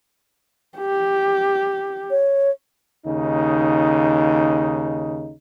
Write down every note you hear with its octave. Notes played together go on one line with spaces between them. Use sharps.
G4
C#5
D#2 C#3 D#4